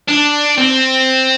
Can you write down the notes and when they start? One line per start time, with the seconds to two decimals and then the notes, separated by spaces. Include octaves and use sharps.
0.08 D4
0.58 C4